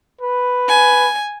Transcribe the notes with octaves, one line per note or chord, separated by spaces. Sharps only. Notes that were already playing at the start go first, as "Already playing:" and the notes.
B4
G#5